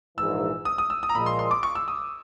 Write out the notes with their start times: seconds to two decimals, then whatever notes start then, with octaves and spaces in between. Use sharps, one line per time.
0.17 A#1 G#2 E3 E6
0.65 D#6
0.78 D#6
0.90 E6
1.03 D#6
1.09 A#5
1.15 A#2 F3 G#3 B5
1.26 C6
1.39 C6
1.51 D6
1.63 C#6
1.75 E6
1.88 D#6